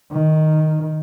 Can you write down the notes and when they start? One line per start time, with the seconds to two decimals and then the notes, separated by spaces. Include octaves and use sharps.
0.12 D#3